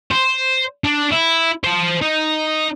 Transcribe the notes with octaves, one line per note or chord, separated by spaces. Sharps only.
C5
D4
E4
C5 A5
D#4